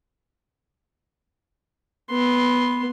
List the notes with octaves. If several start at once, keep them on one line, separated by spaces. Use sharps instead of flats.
B3 C6